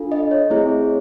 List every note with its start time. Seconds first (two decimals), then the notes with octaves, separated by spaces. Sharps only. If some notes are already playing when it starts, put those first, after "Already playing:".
Already playing: D4 F4 A4
0.12 D#5
0.31 C#5
0.50 A3 C4 E4 G#4 C#5